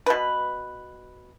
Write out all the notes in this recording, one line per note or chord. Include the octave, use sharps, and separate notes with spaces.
B2 B4